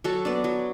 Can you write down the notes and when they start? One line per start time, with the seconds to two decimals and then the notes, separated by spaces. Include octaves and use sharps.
0.04 F#3 F#4 A4
0.25 B3 D4
0.44 F#3